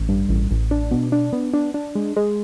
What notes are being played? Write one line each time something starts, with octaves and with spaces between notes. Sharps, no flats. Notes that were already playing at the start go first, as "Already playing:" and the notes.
Already playing: A1
G2
A1
A1
D4
B2
D4
B3
D4
D4
G#3
G#3